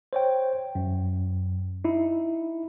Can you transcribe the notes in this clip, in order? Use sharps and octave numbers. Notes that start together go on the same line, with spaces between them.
C5 C#5 G5
F#2
D#4 E4